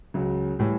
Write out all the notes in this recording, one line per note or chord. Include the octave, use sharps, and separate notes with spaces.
C#2 C#3 F#3
A2 E3 G3